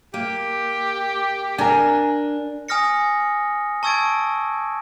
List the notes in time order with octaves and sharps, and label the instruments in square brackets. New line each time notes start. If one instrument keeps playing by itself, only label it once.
[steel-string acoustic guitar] A#3 [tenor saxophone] G4
[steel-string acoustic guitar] D4 [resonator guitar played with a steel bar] A#4 G#5
[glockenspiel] G#5 D#6 F6 A#6 C#7
A5 C#6 E6 G#6 A6 D7